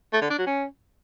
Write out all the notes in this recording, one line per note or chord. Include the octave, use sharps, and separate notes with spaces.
A3
D3
D4
F#3
C#4